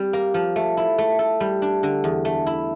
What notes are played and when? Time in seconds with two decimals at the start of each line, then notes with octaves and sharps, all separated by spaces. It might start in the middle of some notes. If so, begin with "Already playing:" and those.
Already playing: G3 C4
0.13 A#3
0.34 F3
0.56 A3
0.77 E4
0.98 A3
1.19 A4
1.40 G3
1.62 D4
1.83 D3
2.04 E2
2.25 A3
2.47 E4